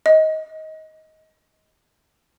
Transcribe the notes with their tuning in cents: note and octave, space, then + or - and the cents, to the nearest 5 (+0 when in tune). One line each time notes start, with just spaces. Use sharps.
D#5 +20